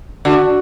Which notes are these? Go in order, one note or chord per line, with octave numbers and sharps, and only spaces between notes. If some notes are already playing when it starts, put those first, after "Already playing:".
D3 F#4